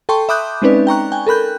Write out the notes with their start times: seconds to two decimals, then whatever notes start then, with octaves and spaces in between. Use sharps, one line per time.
0.09 A4 G5 A5 C6 C#6
0.29 E5 B5 D6 D#6 F#6 G6
0.62 G#3 C4 C#4 D#4 B4 D5
0.87 G5 A#5 C#6 F#6
1.12 G5 G#5
1.27 A4 A#4 B5 F#6 G6